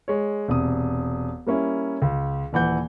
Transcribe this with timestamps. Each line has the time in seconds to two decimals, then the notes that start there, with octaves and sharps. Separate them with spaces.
0.08 G#3 C#5
0.48 E1 C3 D#6
1.46 G3 A#3 C#4 E4
2.02 C#2
2.53 D#1 E3 F#5 G6